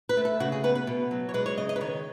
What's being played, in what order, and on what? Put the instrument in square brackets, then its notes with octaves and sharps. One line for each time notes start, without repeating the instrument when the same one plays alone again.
[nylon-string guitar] B4
A3
A4
C#3 F#4
G#4
B3 B4
B4
B2
F#3
C#5
G#3 B4
C#5
C#3 D#5
D#5
B4
D#3 C#5